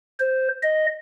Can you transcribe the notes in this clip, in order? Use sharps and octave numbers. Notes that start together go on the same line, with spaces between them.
C5
D#5